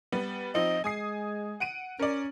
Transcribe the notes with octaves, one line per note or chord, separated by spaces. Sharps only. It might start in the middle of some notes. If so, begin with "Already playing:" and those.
G3 B3
F3 C4 D#4 D#5
G#3 G#5 D#6 C7
F#5 D7 D#7
C#4 A#4 D5